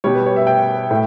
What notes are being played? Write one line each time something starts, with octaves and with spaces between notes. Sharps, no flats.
B2 G3 C#5
B4
C#5
E5
G5
A2